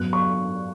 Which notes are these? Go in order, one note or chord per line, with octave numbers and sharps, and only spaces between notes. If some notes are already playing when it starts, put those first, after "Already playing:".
Already playing: F#2 F#3 B3 F#6
C#6